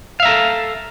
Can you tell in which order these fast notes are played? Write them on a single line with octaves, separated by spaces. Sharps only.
F5 E5 A#5 A4